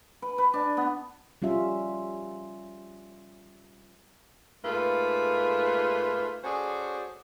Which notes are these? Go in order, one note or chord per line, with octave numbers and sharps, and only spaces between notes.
B4
B4
D4
B3
G3 C#4 F4 E5
G#2 A3 A#3 F4 B4
C#4 F#4 G#4 A4 C5 D5